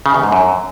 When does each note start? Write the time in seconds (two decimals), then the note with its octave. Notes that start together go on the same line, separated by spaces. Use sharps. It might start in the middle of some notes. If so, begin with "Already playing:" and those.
0.06 C#3
0.15 E2
0.23 G#2
0.32 F#2